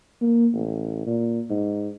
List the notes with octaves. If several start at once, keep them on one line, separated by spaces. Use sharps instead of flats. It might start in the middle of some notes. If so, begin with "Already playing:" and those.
A#3
A1
A#2
G#2